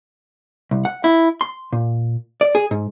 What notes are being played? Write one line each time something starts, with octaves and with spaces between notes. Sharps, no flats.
C2
F#5
E4
C6
A#2
D5
G#4
G#2